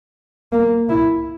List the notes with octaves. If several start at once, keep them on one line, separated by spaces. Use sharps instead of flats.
A#3
E4